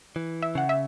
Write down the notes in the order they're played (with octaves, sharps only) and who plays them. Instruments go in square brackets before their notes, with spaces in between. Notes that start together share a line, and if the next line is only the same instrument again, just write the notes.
[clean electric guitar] E3
[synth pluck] E5
[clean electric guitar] C#3 [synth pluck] F#5
[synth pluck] E5